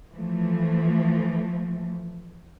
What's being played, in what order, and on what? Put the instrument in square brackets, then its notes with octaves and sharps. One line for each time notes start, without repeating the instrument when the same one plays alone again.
[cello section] E3 F3 A3